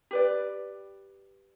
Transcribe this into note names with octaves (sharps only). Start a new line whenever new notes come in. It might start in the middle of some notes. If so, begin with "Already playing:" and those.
G4 B4 D5